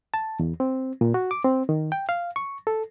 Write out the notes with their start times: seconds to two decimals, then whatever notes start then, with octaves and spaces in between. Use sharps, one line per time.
0.14 A5
0.39 E2
0.60 C4
1.01 A#2
1.14 F#4
1.31 D6
1.45 C4
1.69 D#3
1.92 G5
2.09 F5
2.36 C#6
2.67 A4